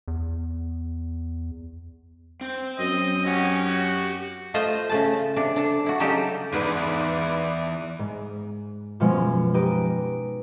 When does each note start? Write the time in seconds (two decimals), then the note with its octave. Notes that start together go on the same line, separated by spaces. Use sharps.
0.08 E2
2.41 C4
2.79 F#2 D#5
3.26 C#4 G4 F#5 G5
3.69 F#4
4.54 A3 F4 C5 D#5
4.90 C#3 A3 A5
5.36 C3 D4
5.56 D4 A4
5.86 E4 F#4
6.00 C#3 F#3 G3 D#4 G4 A4
6.53 E2 G#2 B4 D5
7.99 G#2
9.00 F#2 B2 F3 G#3 C#4
9.54 D#4 G4 B4 D7 D#7